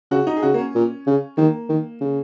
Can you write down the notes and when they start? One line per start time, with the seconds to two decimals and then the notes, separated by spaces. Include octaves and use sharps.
0.11 C#3 F#4
0.27 D#4
0.37 G#4
0.42 C#3 F#4
0.54 A#3
0.58 C#4
0.75 A#2
1.07 C#3
1.37 D#3 A#3
1.69 D#3
2.01 C#3